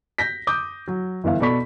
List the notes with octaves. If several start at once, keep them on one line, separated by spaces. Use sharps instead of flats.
G6 A#6 B6
D6 D#6 G6
F#3
G1 E3 B3 E5 F5
B2 A4 D5 B5 C#6 B6